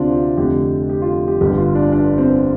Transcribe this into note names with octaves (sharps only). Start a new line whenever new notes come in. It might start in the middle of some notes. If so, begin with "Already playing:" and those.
Already playing: D2 C3 C4 D4 F4 G4
F4
F1 F2 D3 G4
G4
F4
G4
G1 G2 D3 G4
F4
D4
D4
C4